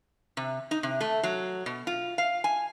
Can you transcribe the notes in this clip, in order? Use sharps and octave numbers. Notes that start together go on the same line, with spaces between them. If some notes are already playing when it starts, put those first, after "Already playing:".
C3
D#4
C3
A3
F#3
B2
F4
F5
G#5